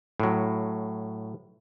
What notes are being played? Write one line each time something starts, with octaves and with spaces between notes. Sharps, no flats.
A2 F#3